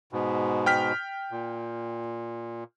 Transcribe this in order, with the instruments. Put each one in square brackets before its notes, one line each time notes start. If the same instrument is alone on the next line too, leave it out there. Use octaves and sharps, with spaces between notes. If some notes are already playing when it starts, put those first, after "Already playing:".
[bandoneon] G#2 B2
[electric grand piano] G5 F6 B6
[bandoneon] A#2